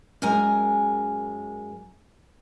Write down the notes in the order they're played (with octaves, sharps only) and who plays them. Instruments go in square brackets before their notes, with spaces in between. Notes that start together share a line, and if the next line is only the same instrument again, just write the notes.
[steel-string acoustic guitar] F#2 G#3 A#4 G#5 A#5